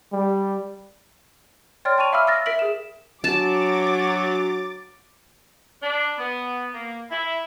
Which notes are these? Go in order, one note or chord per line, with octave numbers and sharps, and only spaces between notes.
G3
C#5 D5 G5 C6 F6 A6
G5 A5 C#6 D#7 F7
E5 F5 B5 D6 E6 F6
E6 F6 A6 A#6
A#4 E5 B6 D7 F#7
G#4 E7
F#3 D4 F#4 G#5 A5 D6 A6
D4
B3
A#3
E4